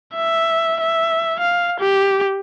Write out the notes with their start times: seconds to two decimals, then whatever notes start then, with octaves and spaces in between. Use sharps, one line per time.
0.14 E5
0.81 E5
1.40 F5
1.80 G4